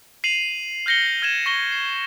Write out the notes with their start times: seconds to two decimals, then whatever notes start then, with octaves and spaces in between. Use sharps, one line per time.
0.24 C7 D#7 F7 F#7
0.86 F6 G6 A#6 C#7 G7
1.22 F6 G#6 D#7 E7 G7
1.46 C#6 A#6 G7
1.72 C7